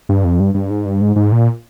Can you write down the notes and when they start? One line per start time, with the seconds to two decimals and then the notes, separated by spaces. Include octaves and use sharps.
0.09 G2
0.24 F2
0.40 G2
0.54 G2
0.70 G#2
0.85 G2
1.01 G#2
1.16 G#2
1.32 A#2